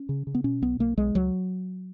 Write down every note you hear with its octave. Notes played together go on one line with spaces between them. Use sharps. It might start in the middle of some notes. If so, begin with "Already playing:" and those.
Already playing: C#4
C#3
C#3
B3
B2 C#4
B1 B3
B1 A#3
B1 G#3
C#2 F#3